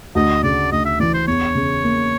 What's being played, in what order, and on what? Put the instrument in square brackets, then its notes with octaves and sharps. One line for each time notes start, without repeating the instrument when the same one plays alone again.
[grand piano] D2 [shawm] D#5
[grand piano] C#3 [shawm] D5
[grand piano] D2 [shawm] D#5
[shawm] E5
[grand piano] E3 [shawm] D5
[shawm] C5
[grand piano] E2 [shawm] C#5
[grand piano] C#3
A#3